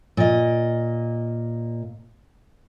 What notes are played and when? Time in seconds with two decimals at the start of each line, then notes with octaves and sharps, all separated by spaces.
0.17 A#2 D#5